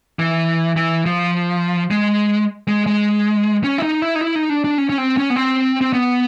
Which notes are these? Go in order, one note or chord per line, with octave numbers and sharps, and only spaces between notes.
E3
E3
F3
G#3
G#3
G#3
C#4
E4
D#4
E4
D#4
E4
D#4
D4
D4
C#4
C#4
C4
C#4
B3
C4
C4
B3